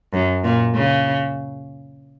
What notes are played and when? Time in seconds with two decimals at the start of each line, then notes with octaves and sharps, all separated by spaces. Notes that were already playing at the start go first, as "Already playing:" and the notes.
0.14 F#2
0.44 A#2
0.76 C#3